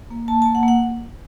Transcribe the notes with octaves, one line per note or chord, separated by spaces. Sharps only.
A#3
A#3 A5
A#3 A5
F#5
A#3
F#5